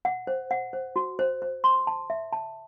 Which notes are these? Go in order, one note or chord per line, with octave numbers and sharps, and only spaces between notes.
F#5
C5
F#5
C5
F#4
C5
C5
C6
A5
E5
A5